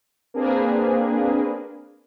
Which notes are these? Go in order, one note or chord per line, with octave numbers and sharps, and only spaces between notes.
A#3 C4 D4 G#4 B4